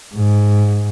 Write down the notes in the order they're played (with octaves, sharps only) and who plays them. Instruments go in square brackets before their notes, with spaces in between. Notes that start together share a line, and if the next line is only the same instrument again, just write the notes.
[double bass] G#2